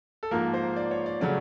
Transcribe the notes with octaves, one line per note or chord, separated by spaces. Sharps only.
A4
G#2 F3 A#3 A#4
C5
D5
C#5
D5
C#3 F#3 A3 C#4 D5